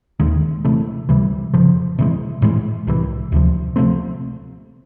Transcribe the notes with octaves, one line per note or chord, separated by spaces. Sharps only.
D#2 D#3 G#3
C3 E3 A3
C#2 C3 E3 G3
F2 C#3 F3
C3 E3 G#3
A2 E3 G#3
C2 C3 E3
D2 C3 F3
C3 F3 A3 C4